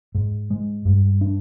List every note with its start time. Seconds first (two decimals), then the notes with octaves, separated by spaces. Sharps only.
0.15 G#2
0.50 G#3
0.85 G2
1.21 D4